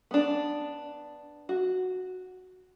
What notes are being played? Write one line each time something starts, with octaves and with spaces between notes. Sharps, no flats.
B3 D4
F#4